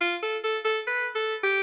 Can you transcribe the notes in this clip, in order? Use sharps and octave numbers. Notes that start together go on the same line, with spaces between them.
F4
A4
A4
A4
B4
A4
G4